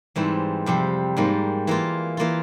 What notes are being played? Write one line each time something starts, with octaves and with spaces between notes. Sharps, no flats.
G#2 E3 G3 C4
F2 C3 G3
G#2 G3 A#3
E3 A#3 F4
E3 A#3 F4